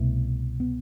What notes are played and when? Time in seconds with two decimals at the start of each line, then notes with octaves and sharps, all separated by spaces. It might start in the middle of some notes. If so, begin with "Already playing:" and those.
Already playing: C2 B2 A3
0.60 B3